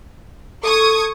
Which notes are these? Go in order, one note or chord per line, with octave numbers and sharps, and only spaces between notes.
A4 C#6 D#6 G#6